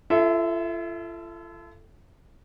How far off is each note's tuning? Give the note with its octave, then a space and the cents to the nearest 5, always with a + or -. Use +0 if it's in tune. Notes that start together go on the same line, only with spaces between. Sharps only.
F4 -40 A4 +0 E5 +0